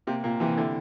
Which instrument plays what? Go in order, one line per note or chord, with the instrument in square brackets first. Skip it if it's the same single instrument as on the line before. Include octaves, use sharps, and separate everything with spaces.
[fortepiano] C3 [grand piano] A#3
[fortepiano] A#2 [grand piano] A#3
[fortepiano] C3 [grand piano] E3
[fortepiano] D3 [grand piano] E4